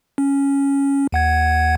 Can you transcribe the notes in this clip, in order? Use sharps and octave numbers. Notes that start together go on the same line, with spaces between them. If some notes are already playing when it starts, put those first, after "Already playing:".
C#4
D#2 F#5 G#6